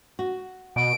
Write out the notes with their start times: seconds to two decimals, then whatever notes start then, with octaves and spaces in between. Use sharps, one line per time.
0.19 F#4
0.76 B2 D7